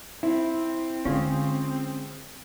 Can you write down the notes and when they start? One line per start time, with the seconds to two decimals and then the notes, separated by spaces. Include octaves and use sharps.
0.23 C4 E4
1.05 D3 G#3 C#4 F4 G#4